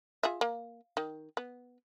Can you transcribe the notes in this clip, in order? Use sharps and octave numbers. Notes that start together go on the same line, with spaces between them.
F4 G#4 E5
A#3
D#3
B3